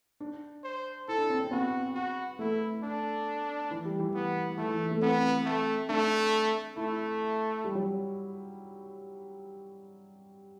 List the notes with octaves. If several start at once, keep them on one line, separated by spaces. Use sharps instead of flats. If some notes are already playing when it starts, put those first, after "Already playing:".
D4
C5
E4 A4
D4
C4
C4
B3 F#4
F#4
A3 E4
D4
E3
G3
E3
B3
E3 A3
E3
A3
B3 C4
A3
A3 D4
A3 E4
G3
F#3